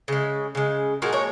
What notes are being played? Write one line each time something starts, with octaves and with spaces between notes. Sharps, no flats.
C#3 G#3
C#3 G#3
A#2 F3 G#3 F#4 A#4
A#4 C#5